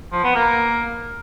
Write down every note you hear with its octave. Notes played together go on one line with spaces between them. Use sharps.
F3
B3
A#3